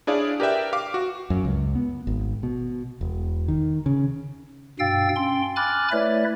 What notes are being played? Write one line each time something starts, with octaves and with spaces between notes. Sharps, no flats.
D4 E4 G#4 C#5 D5 F5
G4 A#4 B4 D5 E5 G5
F5 D6
F#4
F#2
C#2
B3
G#1
B2
E1
D#3
C#3
G2 B2 F5 G5 E6 A6
C#4 G5 C6
G#5 B5 D6 F6 F#6 A6
A3 E4 B4 C#5 D5 E5